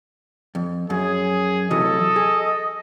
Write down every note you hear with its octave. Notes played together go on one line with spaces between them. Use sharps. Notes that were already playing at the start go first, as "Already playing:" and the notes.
F2
F#2 G#4
C3 E3 F#3 A4 D#5
G#4